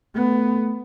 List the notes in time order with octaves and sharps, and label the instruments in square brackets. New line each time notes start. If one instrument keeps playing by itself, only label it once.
[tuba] A3 [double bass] B3